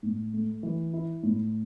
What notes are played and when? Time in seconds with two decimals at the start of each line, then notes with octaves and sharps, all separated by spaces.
0.03 A2
0.33 A3
0.63 E3
0.93 E4
1.23 A2